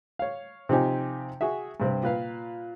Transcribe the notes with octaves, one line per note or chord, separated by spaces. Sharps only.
C#5 F5
C3 F3 C4 D#4 G4 G#5
F#4 G#4 E5
G2 C3 C4
A#2 B4 F5